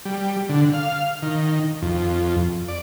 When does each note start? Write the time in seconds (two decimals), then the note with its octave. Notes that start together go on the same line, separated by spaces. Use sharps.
0.05 G3
0.49 D3
0.74 F5
1.22 D#3
1.82 F2
2.68 D5